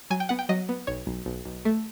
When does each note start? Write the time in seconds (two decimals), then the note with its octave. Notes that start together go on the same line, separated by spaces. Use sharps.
0.10 F#3 G#5
0.20 G5
0.29 B3 F#5
0.39 G5
0.49 F#3 D#5
0.69 B3
0.87 B1 C#5
1.07 B1
1.26 B1
1.45 B1
1.65 A3